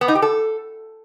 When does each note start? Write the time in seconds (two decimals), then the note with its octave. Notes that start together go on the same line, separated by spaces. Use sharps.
0.01 B3
0.08 D#4
0.15 G4
0.22 A4